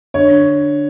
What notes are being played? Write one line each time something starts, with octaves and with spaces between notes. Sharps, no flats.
D3 C#5